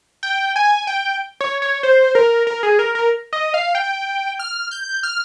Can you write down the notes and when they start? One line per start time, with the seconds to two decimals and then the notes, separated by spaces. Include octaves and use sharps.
0.23 G5
0.56 G#5
0.87 G5
1.41 C#5
1.62 C#5
1.83 C5
2.15 A#4
2.47 A#4
2.63 G#4
2.79 A#4
2.95 A#4
3.33 D#5
3.54 F5
3.75 G5
4.39 F6
4.71 G6
5.03 F6